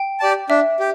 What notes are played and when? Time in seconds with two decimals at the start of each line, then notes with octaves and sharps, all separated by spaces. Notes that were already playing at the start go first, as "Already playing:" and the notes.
Already playing: G5
0.20 G4 D5 A5
0.50 D4 E5
0.80 G4